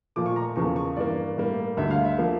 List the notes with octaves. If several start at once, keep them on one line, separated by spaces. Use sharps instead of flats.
A#2 F3 A3 D6
C#6
A#5
E2 C#3 F3 A#3 C#6
C#6
G2 E3 A#3 D5
A2 G3 A#3
D2 D3 G3 E5
F5
E5
F3 A#3